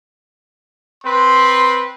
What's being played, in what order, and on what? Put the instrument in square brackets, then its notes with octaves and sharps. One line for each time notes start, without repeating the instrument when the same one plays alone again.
[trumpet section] C4 B4 [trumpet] C6